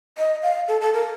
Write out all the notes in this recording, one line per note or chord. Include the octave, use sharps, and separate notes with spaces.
D#5
F5
A4
A4
A#4